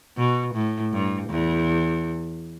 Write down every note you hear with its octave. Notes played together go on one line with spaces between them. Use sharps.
B2
A2
G2
E2